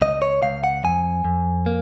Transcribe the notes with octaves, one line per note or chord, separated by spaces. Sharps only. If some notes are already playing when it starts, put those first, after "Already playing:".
C#2 D#5
C#5
C#2 F5
F#5
F2 G#5
F2
A#3